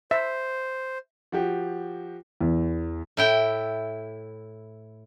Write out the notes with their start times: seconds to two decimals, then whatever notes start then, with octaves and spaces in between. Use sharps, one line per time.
0.11 C5 E5
1.32 F3 F#4 G4
2.41 E2
3.17 A2 E4 G5